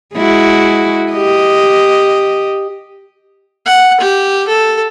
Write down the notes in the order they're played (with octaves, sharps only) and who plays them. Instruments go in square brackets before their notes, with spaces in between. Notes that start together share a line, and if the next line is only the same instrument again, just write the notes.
[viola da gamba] G#3 E4 F#4
G4 D#5
[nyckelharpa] F#5
G4
A4